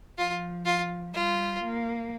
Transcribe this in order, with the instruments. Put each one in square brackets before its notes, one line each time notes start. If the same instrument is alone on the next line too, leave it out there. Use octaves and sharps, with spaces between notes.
[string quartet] F3 [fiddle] F4
[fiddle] F4
[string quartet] G3 [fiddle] F4
[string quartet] A#3